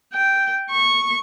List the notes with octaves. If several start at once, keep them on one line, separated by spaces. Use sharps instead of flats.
G5
C#6